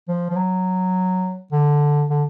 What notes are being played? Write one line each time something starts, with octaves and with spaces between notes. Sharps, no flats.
F3
F3
F#3
D3
D3